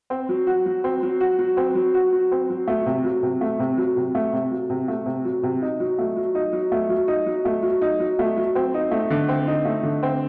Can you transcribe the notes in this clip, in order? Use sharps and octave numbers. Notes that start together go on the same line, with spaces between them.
C4
F#3
F#4
F#3
C4
F#3
F#4
F#3
C4
F#3
F#4
F#3
C4
F#3
A3
C3
F#3
C3
A3
C3
F#3
C3
A3
C3
F#3
C3
A3
C3
F#3
C3
D#4
F#3
A3
F#3
D#4
F#3
A3
F#3
D#4
F#3
A3
F#3
D#4
F#3
A3
F#3
C4
D#4
A3
D3
C4
D#4
A3
D3
C4